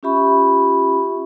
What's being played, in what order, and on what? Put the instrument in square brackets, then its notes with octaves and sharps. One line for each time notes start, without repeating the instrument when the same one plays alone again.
[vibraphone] C#4 F4 G4 E5 B5 C#6